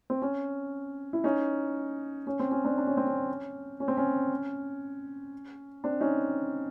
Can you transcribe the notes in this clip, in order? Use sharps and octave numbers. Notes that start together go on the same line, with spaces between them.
C4
C#4
E4
C#4 D#4
C#4
C4
C#4
C4 D4
D4
C#4
C4
C#4
C#4
C4
C#4
C4 D4
C#4 D#4